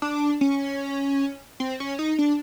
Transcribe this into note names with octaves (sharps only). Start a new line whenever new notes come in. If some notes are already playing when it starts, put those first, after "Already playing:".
D4
C#4
C4
C#4
D#4
D4